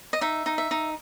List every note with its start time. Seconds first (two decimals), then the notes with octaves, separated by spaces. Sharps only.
0.13 D#5
0.21 D#4 E5
0.46 D#4
0.58 E5
0.71 D#4